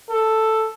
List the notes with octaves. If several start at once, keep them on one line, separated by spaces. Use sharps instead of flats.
A4